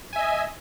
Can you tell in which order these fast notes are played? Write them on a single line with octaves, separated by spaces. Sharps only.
G#5 E5 D#5